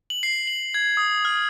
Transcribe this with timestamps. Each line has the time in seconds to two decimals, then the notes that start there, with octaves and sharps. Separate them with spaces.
0.10 F#7
0.23 C7
0.47 F#7
0.74 G#6
0.97 D#6
1.25 F6